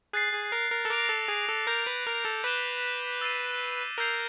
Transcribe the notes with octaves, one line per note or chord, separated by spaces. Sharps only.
G#4 F#6 A6 C7
G#4
A#4
A#4
A4
A#4 D6 F#6 A#6 D7 F7
A4
G#4
A4
A#4 G6 C7 F7
B4
A#4
A4
B4 D6 F#6 B6 E7 G7
E6 A6 C7 D#7
A#4 E6 G6 C7 F7